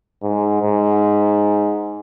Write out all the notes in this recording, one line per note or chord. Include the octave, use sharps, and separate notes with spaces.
G#2
G#2